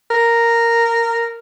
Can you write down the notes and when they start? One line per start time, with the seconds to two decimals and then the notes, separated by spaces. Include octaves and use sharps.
0.10 A#4